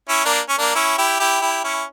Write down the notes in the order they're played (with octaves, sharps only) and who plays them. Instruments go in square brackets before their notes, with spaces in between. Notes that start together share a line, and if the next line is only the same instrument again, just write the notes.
[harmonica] C#4 E4
A#3 D4
C#4
A#3 D4
C#4 E4
E4 G4
E4 G4
E4 G4
C#4 E4